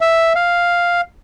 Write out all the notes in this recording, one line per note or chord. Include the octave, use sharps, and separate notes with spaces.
E5
F5